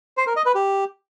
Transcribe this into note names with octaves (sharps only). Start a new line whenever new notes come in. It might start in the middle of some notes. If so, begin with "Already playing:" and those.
C5
A#4
D#5
B4
G4